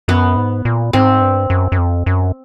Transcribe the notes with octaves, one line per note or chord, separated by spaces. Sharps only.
F#2 B3
G#2
A#2
G#2 C4
G2
F#2
F#2
F2
F#2